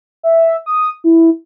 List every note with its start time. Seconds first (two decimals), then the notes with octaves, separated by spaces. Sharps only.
0.23 E5
0.66 D#6
1.04 E4